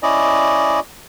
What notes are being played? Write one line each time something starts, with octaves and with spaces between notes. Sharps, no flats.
C#4 E4 D5 D#5